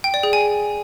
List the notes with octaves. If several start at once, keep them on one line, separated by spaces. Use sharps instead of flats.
G5
D5
G#4
G#5